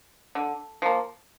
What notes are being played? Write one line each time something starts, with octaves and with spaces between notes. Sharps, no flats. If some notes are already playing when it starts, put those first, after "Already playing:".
D3
F3 A#3